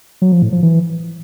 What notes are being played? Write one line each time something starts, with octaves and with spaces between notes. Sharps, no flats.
F#3
F3
A2
F3
E3